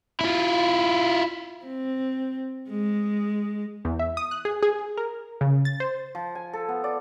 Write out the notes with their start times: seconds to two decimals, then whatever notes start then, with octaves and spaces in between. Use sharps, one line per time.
0.21 E4 F4
1.66 C4
2.70 G#3
3.85 E2
3.99 E5
4.17 D#6
4.31 F#6
4.45 G#4
4.63 G#4
4.97 A#4
5.41 C#3
5.65 A6
5.80 C5
6.15 F3
6.35 G#5
6.53 A4
6.69 B3
6.84 D5